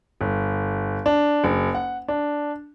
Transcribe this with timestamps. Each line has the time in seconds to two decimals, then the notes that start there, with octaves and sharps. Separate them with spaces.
0.21 G1
1.06 D4
1.44 F#1
1.75 F#5
2.08 D4